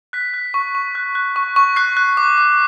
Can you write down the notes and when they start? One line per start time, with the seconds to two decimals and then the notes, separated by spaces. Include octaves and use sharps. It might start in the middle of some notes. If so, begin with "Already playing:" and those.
0.13 F#6 B6
0.34 F#6
0.54 C#6
0.75 C#6
0.95 F#6
1.15 F#6
1.36 C#6
1.56 C#6
1.76 F#6 C7
1.97 F#6
2.17 D6
2.38 D6